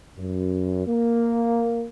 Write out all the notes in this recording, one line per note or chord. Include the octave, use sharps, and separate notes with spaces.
F#2
A#3